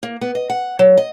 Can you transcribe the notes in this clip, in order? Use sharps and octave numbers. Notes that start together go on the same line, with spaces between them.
A#3
B3
D#5
F#5
F#3
D#5